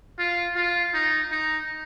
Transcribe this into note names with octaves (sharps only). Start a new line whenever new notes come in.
F4
F4
D#4
D#4